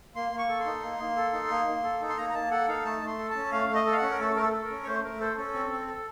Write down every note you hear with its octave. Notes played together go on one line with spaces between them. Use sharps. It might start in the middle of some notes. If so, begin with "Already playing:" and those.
A#3 C6
A#3
C#6
A4
C6
D#4
A#3
A#3
A4
D#4
A#3
A#3
A4
D#4
C6
A#3 A#5
A#5
A#3 A5
A4 F#5
D#4 F5
A3 A5
A3 C6
A4
A5
C#4
A3 F5
A3
D#5
A4
F5
F#5
C#4
A#4
A3 A4
A3 A#4
A4
A4
A#4
C#4
C#5
A3 C5
A3 A#4
A4 C5
C#4 A4
C4
C4
A4